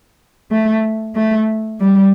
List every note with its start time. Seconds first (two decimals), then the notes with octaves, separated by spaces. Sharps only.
0.51 A3
1.16 A3
1.81 G3